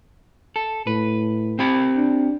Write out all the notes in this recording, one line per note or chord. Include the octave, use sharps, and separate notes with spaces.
A4
A2 B4
C4 G4 B5
D4